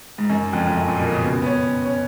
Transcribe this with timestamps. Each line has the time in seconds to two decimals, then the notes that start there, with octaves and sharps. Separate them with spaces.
0.18 G#2
0.30 F#2
0.53 F2
0.67 F2
0.76 F#2
0.88 A#2
1.00 B2
1.11 C#3
1.23 B3
1.42 B3
1.46 C#4
1.85 C#4